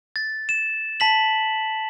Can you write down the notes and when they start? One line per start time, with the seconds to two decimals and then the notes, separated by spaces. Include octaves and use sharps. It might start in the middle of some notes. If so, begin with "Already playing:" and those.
0.16 A6
0.49 E7
1.00 A5 B6 F#7